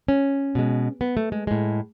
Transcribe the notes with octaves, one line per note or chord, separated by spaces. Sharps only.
C#4
B2 G#3
B3
A3
G#3
A2 G#3